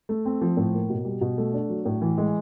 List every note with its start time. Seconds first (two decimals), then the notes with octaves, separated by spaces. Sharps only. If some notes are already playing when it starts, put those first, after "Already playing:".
0.09 A3
0.25 C4
0.42 F3
0.57 A2
0.73 A#3
0.90 B2
1.05 G3
1.21 B2
1.38 A3
1.53 D4
1.69 F#3
1.85 A2
2.02 E3
2.18 G#3